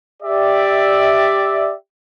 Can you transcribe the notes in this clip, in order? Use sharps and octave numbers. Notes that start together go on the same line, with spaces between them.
G4 D5 E5